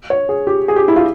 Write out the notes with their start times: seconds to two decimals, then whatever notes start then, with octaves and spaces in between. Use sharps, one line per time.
0.10 C#5
0.29 G#4
0.47 G4
0.68 G#4
0.76 G4
0.88 E4
0.96 F4